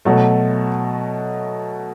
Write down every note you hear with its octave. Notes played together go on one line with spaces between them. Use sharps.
B2 F#3 A3